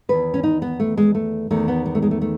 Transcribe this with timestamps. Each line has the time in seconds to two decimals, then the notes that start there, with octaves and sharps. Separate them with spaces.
0.09 E2 D#3 B4
0.34 C#4
0.43 D#4
0.62 B3
0.80 A3
0.97 G#3
1.15 A3
1.51 E2 D#3 A3
1.68 B3
1.86 B3
1.95 A3
2.02 G#3
2.11 A3
2.21 A3